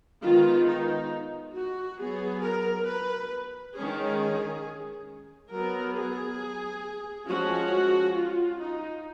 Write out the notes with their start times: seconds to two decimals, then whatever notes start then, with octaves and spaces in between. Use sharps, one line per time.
0.23 D#3 G#3 B3 F4
0.67 D#4
1.55 F#4
1.99 F#3 B3 G#4
2.43 A#4
2.87 B4
3.75 D#3 G#3 C#4 G#4
5.51 F#3 B3 A#4
5.95 G#4
7.27 F3 G#3 C#4 F#4
8.15 F4
8.60 D#4